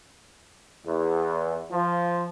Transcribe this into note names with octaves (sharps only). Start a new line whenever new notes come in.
E2
F3